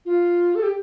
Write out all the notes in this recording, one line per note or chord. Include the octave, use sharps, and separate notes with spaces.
F4
A4
G4